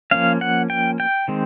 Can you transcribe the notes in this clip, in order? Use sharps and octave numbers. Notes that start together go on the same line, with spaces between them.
F3 A#3 C#4 F5
F#5
G5
G5
D#3 G#3 C4